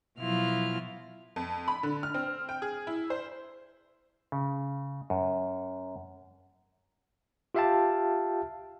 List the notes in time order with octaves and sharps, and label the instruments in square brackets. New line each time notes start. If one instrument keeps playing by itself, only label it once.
[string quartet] B2 F3 F#3 E4 F4 F6
[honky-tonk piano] F2
B5
D3
F6
C4
G5
G#4
E4
C5
[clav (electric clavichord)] C#3
F#2
[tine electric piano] F4 G4 E5 F5 G5 A5